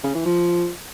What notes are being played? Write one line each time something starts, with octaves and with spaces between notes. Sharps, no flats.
C#3
E3
F3